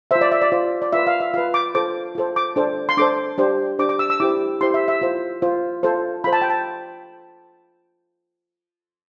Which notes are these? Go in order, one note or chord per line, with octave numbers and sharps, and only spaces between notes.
F4 C5 E5
D5
E5
D5
F4 C5
D5
F4 B4 E5
F5
E5
F4 B4 F5
D6
F4 A4 C5 D6
F4 A4 C5
D6
D4 A4 C5
C6
D4 A4 C5 D6
D4 G4 C5
D4 G4 C5 D6
D6
E6
E6
E4 G4 C5 D6
E4 G4 C5 C6
E5
E5
F4 C5
F4 C5
F4 A4 C5
F4 A4 C5 B5
A5
G5
A5